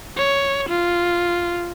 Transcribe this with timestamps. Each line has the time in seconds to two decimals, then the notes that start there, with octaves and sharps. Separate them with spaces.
0.17 C#5
0.69 F4